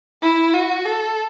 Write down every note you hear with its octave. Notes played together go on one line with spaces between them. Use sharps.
E4
F#4
A4